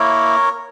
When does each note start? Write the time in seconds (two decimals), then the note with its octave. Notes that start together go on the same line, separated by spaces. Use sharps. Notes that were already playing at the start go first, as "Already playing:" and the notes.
Already playing: A#3 E4 A#4 C#5